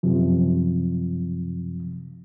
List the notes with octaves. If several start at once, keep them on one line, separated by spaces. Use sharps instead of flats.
F#2 C3 F3